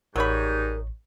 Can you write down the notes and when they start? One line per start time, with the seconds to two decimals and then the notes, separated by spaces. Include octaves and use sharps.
0.16 A1 G#2 F#3 G3 D#4 A#4 C#5 B5